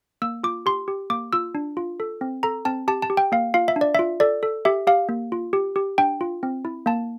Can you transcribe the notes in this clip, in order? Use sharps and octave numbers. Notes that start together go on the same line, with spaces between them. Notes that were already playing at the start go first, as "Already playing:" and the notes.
A#3 E6
F4 D6
G4 C6
G4
A#3 D6
F4 E6
D4
F4
A4
C4
A4 A#5
C4 A5
G4 A5
A5
G4
G5
A#3 F5
F4 F5
E5
D4
D5
E5
F4
A4 D5
A4
G4 E5
G4 F5
A#3
F4
G4
G4
D4 G5
F4
C4
E4
A#3 A5